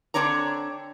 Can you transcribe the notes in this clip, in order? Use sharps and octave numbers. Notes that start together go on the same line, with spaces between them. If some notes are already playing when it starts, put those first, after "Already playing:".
D3 C4 D4 C#5 A#5